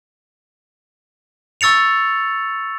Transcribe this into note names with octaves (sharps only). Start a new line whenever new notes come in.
C#6 E6 A6 C#7 F7